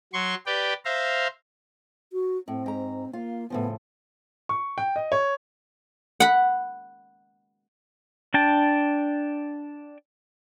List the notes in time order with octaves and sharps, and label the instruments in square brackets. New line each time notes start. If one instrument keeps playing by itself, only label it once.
[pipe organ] F#3 C6 C#6
G4 B4 D5 G5
C5 E5 F5 A#5
[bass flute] F#4
[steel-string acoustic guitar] A2 [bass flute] C4
[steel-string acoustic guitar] G#2 A#5
[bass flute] A#3 [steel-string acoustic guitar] F4
[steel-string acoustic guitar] A2 C#3 F3 [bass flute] B3
[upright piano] C#6
G5
D#5
C#5
[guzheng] F#5 B5
[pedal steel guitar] D4 G5 A5